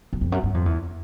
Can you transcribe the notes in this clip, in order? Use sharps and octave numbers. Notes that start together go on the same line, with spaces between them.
F#2
F2
F#2
G2
F2
E2